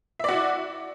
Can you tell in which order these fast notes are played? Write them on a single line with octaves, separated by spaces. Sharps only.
E5 D5 F#4 E4